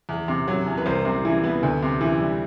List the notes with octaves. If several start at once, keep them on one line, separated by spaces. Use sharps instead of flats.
E2
C3
F#3
E2
B4
C2 C5
C3
E3
B3
D2
C3
E3
G3